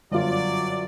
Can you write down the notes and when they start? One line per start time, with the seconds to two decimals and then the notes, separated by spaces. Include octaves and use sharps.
0.11 G1 F#2 F#3 F4 D5